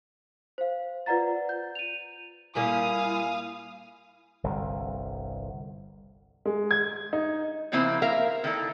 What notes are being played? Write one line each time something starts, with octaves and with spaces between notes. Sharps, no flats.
C5 F5
F4 B4 D5 F#5 A#5 A6
G6
D#7 F7
A#2 G3 A#3 E4 F5 G#5 D#6
G1 C2 D3
G#3
G#6
D#4
C#3 F3 A#3 C4 E4 C5
A#3 A#4 E5 F5
D#3 E4 A4